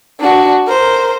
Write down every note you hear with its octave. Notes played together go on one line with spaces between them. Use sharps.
D4 F#4
A#4 C5